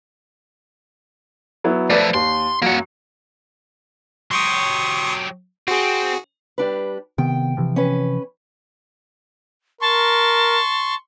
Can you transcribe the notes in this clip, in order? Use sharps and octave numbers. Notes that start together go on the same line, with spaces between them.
F#3 B3 E4
F3 A3 B4 D5
D#2 C6
F#2 F#3 A#3 F#5
F#3 G4 C6 C#6 D#6
C4 F#4 G#4
G3 D4 B4
C3 D#3 B3 G5
C3 E3 F3
C#4 B4
A#4 A5 C6 C#6